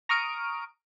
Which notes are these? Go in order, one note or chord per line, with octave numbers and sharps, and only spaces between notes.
A#5 C#6 D#6 F6 D7